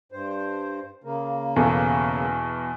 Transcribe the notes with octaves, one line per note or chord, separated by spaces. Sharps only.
G2 C5
C#3 A#3
E2 B2 A4